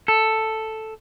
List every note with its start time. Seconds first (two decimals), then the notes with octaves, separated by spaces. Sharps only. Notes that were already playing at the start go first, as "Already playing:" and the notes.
0.08 A4